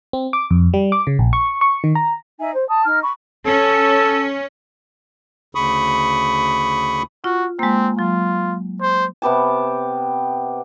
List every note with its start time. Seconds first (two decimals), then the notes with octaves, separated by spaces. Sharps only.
0.13 C4
0.33 D6
0.51 F2
0.74 G3
0.92 D6
1.07 C#3
1.19 A#1
1.33 C#6
1.61 C#6
1.84 D#3
1.95 A#5
2.39 D#4 E5 G#5
2.54 C5
2.68 A5 D#6
2.85 D#4 F6
3.03 B5 C#6
3.46 C#4 A4
5.55 D2 C#3 B5 C#6 D#6
7.24 F4 F#4
7.59 G#3 A#3 C4
7.99 F#3 F4
8.82 C5
9.22 C3 B3 G4 A5